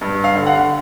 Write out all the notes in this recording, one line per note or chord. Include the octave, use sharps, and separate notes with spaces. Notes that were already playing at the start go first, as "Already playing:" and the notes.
G2
F5
D3
F#5